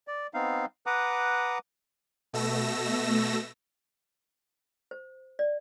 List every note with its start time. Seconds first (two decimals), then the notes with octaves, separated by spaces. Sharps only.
0.07 D5
0.34 B3 C4 D#4 F5
0.86 B4 F#5 A#5 D6 D#6
2.33 B2 A3 E6 A#6
4.91 C5
5.39 D5